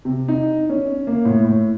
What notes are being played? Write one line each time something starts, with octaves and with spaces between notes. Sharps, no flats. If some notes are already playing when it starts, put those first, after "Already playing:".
C3
D#4
C#4
A#3
A2
A2